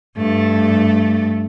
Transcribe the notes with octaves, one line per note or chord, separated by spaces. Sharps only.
G2 A3